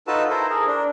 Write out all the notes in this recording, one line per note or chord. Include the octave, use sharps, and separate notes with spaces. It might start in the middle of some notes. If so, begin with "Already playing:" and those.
D#4 F4 F#4 A4 B4 A5
E4 A4 A#4 C5
G#4 A#4
D4